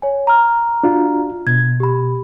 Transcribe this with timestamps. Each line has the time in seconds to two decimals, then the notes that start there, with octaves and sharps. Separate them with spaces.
0.02 C#5 G#5
0.27 A#5 F6
0.83 D4 F4 F#4
1.47 B2 G#6
1.80 G4 B5